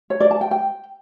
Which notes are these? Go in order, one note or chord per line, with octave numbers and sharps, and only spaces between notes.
C#5
D5
A5
G5
G5